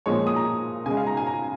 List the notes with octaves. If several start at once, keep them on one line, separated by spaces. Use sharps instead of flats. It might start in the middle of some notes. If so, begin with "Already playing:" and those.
A#2 F3 G#3 C#5
D#6
A#5
C#3 G#3 G#5
F5
A#5
G#5
A#5